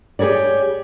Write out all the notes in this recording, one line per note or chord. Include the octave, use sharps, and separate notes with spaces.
G4 G#4 A#4 C#5 D5